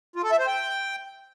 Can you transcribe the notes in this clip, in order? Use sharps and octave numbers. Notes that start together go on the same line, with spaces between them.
F4
A4
E5
C5
G5